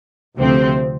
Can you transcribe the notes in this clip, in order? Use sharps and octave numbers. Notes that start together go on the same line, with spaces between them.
D2 C3 F3 C4